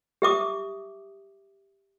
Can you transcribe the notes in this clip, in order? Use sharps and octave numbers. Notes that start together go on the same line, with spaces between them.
G4 E5 D6 D#6